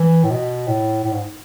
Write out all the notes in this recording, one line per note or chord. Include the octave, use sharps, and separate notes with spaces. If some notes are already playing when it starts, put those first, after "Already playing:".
Already playing: E3
A2
B2
A2
A2
G#2